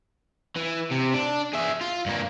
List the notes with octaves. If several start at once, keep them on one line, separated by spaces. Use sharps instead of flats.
E3
C3
D4
G#4 E5
F4
G2 A#3